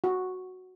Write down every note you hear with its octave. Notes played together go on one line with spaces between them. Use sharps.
F#4